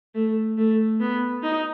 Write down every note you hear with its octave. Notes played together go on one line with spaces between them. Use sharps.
A3
A3
B3
D#4